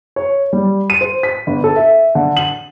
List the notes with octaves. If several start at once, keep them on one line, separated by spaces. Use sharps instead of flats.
C#5
G3
D#7
C5
B6
G1
A4
E5
D3
F#7